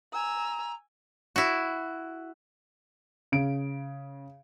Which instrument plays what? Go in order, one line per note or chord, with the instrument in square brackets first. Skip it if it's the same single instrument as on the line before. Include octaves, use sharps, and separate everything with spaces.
[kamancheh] G#5 E6 [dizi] A#5
[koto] E4 F#4
[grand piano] C#3 D7